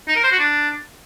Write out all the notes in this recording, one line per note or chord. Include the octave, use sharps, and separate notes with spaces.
D#4
A#4
C5
F#4
D4